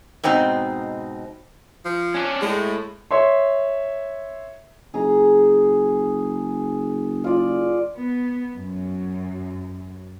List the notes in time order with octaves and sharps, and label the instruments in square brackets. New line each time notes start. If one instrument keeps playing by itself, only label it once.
[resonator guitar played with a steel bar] G#2 B2 C4 D#4
[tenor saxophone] F3
[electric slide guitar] C#4 D4
[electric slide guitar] A2 [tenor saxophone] G#3
[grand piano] C#5 E5 C6
[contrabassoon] F#1 [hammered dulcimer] G#4 A#5
[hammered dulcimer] F4 D5
[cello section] B3
F#2